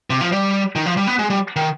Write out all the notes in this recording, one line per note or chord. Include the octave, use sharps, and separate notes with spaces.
C3
F3
G3
D#3
F3
G3
B3
G#3
G3
D#3